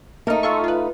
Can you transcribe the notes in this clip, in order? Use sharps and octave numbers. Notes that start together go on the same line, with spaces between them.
A3 A#3 D#4 A#4
F4 A4 C#6
F4 B4